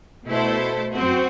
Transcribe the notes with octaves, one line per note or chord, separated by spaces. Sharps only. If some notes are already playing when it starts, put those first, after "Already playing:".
B2 A3 E4 A4 C5
F#2 F#3 C4 F#4